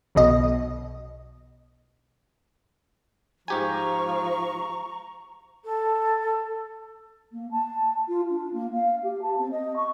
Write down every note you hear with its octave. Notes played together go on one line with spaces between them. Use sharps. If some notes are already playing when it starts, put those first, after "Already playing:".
B1 B2 D#5
G#2 F3 G4 G#5 A#5 C#6
A4
A#3
A5
F4
D4
A#3
F5
G4
A5
C4
D#5
C#6